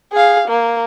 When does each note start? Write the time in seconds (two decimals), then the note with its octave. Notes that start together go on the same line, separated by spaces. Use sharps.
0.13 G#4 F5
0.48 A#3